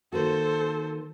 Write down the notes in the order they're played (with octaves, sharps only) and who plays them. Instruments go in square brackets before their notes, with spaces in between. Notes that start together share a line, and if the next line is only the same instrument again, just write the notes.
[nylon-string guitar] D#3 A#3 F#4 [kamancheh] A4 C5